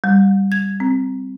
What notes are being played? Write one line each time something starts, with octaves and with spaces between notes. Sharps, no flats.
G3
G#6
C4